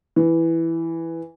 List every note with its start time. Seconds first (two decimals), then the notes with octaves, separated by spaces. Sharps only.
0.16 E3